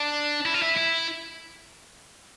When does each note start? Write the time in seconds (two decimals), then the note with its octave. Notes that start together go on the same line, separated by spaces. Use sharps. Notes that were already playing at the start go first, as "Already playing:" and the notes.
Already playing: D4
0.46 E4
0.54 F4
0.62 E4
0.77 E4